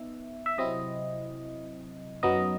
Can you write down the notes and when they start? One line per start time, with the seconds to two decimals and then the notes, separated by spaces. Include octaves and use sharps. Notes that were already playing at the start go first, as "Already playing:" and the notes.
Already playing: B3 D#4 E5
0.46 E5
0.58 C3 F#3 C4 E4 D#5
2.23 F#2 F#3 B3 D#4 D#5